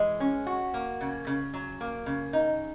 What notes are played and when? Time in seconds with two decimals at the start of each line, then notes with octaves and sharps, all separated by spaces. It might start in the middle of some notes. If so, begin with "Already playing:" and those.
Already playing: E3 G#3
0.20 C#4
0.47 F#4
0.74 A#3
1.01 C#3
1.27 C#3
1.54 F#3
1.81 A#3
2.06 C#3
2.33 D#4